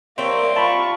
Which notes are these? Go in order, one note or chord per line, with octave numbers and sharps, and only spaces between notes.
G3 A#3 C4 C#5 E5
F4 A5 B5 C#6